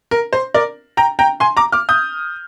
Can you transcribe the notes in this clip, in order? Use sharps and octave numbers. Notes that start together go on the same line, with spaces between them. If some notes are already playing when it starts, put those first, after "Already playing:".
A#4
C5
A#4 D5
G5 A#5
G5 A#5
G#5 C6
A#5 D6
D6 F6
D#6 G6